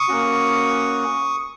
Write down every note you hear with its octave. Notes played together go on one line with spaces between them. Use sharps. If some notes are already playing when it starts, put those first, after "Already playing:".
Already playing: C#6 D#6
A#3 C#4 F#4